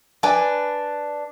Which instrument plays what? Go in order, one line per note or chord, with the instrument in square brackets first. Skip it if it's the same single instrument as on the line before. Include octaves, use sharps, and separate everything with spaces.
[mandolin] D4 B4 [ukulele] G#5 A5